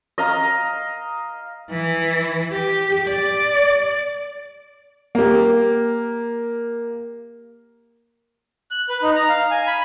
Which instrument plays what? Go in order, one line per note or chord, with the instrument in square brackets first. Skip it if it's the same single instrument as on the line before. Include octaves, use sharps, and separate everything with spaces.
[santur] D#5 F5 A#5
[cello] E3
G4
D5
[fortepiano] A#3 G4
[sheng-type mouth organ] F#6
B4
D#4
A#5
F5
G#5
B5